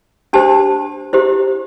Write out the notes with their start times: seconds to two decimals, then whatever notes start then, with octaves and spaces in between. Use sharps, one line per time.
0.33 D4 G4 C5 A5
1.13 E4 G4 C5